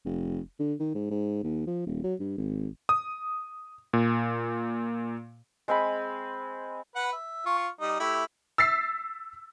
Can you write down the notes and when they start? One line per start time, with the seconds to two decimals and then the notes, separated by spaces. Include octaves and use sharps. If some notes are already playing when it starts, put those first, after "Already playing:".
0.05 F1
0.59 D3
0.80 D#3
0.94 G#2
1.11 G#2
1.44 D#2
1.67 F3
1.86 D#1
2.04 F#3
2.20 G2
2.38 G#1
2.89 D#6
3.93 A#2
5.68 G#3 C4 G#5 B5
6.95 B4 F#5
7.13 E5
7.46 F4 C#6
7.80 G3 D#4
8.00 A3 E4 G4
8.58 E6 A6 B6 C7